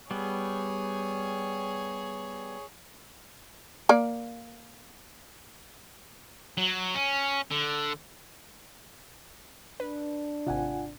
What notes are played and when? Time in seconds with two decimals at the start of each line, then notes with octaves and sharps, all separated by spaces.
0.11 G3 B3 G#4 C#5
3.89 A#3 D5
6.58 F#3
6.95 C#4
7.51 D3
9.80 D4 B4
10.47 G#1 C3 F4 F#5 G#5